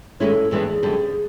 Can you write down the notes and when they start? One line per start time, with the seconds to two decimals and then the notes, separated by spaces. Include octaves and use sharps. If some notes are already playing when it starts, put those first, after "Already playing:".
0.20 G#2 D#3 G#3 C#4 E4 A4
0.51 G2 E3 G#3 B3 D4 G#4
0.67 G#4
0.83 F#2 D3 G3